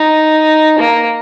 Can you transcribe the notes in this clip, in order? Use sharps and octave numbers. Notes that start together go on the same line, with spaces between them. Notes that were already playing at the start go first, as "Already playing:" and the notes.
Already playing: D#4
A#3